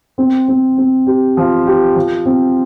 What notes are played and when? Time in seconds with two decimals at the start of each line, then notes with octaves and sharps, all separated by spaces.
0.18 C4
0.48 C4
0.78 C4
1.07 G4
1.37 F3
1.67 G4
1.95 F3
2.26 C4